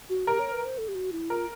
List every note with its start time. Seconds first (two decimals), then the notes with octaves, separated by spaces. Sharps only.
0.09 F#4
0.27 G4 A#4
0.39 C#5
0.52 B4
0.65 C5
0.78 A4
0.88 G4
0.95 F#4
1.12 E4
1.30 F4 A#4